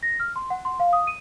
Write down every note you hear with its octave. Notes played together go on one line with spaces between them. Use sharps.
A#6
F6
C6
F#5
C6
F5
D#6
D#7